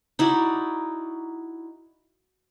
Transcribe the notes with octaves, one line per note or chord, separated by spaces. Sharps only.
D#4 E4 F#4 D5